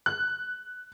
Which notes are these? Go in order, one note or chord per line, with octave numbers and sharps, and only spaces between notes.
F#6